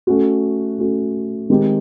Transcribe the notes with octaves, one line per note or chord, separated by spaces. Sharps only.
A3 C#4 F#4
A3 C#4 F#4
D#3 G#3 C4 D#4 G4